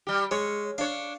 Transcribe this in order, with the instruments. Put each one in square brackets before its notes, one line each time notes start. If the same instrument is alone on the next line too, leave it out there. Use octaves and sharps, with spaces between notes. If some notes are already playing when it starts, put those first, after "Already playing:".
[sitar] G3 G4
[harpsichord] G#3 [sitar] C#5
[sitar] D4 C#5 [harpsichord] F5